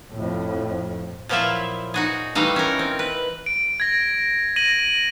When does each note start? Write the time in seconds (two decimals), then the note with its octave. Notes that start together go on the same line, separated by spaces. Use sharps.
0.14 F2 A2
1.29 A#2 F3 F#3 E4 F4 E5
1.94 D#4 F#4 G#4
2.35 E3 G3 A3 D#4 F5
2.56 C#4 A#4
2.79 C4
2.99 B4
3.46 D7
3.80 G#6 A#6
4.56 A#6 D#7 F#7